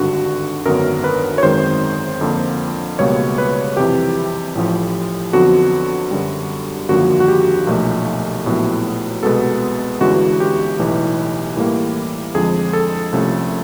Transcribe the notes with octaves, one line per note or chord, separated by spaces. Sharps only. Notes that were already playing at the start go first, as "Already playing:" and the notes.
Already playing: G#1 G2 D3 F#4
G#1 F#2 D3 F#3 B3 A#4
B4
C#5
G#1 F#2 D#3 G#3 C4 C5
F2 D3 F3 A#3
C#2 B2 G3 A#3 C#5
B4
F2 C3 E3 G4
A1 A2 F3
F2 D3 F#3 B3 F#4
F#2 D3 G3
G#1 F#2 D3 F3 A#3 F#4
F#4
G4
B1 A#2 F3 A3
A#1 A2 F#3 B3
C2 B2 G#3 B3 A4
G1 G2 E3 G#3 C#4 F#4
G4
B1 A2 E3
A2 E3 G3 A#3
F2 D3 F3 G#3 G#4
A4
C2 C3 F3 A3 C#4